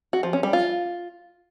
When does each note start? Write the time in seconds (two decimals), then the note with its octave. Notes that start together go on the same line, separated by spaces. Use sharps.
0.13 F#4
0.23 F3
0.33 C#4
0.43 G3
0.53 F4